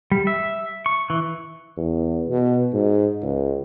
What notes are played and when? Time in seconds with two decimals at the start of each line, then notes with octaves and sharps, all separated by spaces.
0.11 G3
0.27 E5
0.86 C#6
1.10 E3
1.77 E2
2.29 B2
2.73 G#2
3.22 C#2